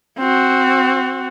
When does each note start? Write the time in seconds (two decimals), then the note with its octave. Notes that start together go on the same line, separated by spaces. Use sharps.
0.19 C4 F#4